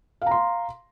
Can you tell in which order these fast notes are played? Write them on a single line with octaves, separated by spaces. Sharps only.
F5 A#5 C6